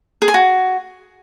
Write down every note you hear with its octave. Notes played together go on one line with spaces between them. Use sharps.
G#4
G#5
F#4